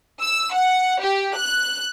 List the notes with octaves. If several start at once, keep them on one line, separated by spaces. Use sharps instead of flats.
E6
F#5
G4
F#6